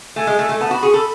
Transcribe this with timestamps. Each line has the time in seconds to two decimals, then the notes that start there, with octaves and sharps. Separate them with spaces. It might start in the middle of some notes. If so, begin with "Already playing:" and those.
0.16 A3 G#5
0.27 G#3
0.39 A3
0.49 A3
0.60 B3 A5
0.71 F#4 B5
0.82 G#4 C#6
0.93 A4 B5